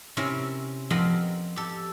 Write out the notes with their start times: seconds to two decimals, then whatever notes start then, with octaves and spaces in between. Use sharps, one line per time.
0.17 C3 C4 C#4 E4 A#4
0.90 F2 B3 C4 A#4 F5 B5
1.56 G4 A4